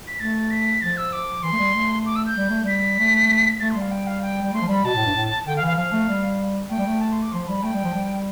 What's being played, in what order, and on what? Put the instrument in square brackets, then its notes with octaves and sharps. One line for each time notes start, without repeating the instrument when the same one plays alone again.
[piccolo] B6
[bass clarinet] A3 [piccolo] A6
[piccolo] B6
[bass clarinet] F3 [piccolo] A6
[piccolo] E6
D6
[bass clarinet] E3 [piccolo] C6
[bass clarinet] A3
G3
A3
[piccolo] D6
E6
G6
[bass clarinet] G3
A3
[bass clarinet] G3 [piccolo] B6
[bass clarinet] A3
[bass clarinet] A3 [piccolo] A6
[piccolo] C6
[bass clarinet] G3
[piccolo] F5
G5
F5
G5
[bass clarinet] G3
[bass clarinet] A3 [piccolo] C6
[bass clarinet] F3
[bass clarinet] G3 [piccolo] B5
[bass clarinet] B2 [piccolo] A5
[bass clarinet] A2
G2
A2
[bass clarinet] D3 [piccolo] G5
[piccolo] F5
[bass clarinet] E3
[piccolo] F5
[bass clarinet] F3 [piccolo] F5
[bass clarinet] A3
G3
[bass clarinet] A3 [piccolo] G5
[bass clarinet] G3
A3
[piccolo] A5
C6
D6
[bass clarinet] F3 [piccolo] C6
[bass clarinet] G3 [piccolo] B5
[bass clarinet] A3 [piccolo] G5
[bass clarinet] G3
F3
G3